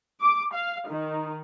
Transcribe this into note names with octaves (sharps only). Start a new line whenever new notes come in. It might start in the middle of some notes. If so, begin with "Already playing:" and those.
D6
F5
D#3